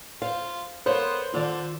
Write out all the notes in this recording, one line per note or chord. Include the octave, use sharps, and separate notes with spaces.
F4 C5 F5
B3 A4 A#4 C5 C#5 F5
D3 D#3 F4 A4 D5